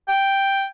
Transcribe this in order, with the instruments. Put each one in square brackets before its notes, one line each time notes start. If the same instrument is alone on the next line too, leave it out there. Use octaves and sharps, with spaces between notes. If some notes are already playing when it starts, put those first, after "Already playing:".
[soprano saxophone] G5